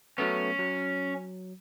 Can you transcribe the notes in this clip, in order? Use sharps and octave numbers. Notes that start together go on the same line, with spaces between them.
F#3 A3 B3 C#4
F#3